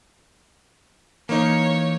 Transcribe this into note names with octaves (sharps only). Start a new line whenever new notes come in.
E3 A#3 D#4 C#5